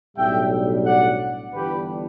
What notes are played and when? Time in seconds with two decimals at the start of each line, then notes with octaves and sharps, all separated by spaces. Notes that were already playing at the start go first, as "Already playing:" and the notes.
0.16 B1 A2 G3 D4 E5 G5
0.85 D5 F#5
1.53 G1 G2 E3 G3 D4 G4 B4